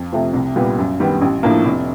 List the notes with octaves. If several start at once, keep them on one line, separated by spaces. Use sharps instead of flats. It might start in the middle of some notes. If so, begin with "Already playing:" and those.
Already playing: F2
C3 F3 A3
C2
A#2 G3 B3
F#2
D#3 G3 B3
A1
A2 F3 A#3 D4
F1